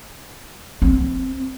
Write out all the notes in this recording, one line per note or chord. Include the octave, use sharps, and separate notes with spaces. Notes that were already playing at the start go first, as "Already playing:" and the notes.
C4